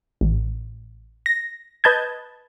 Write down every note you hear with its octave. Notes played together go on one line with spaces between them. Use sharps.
A1
A#6
B4 D#5 A5 G6 G#6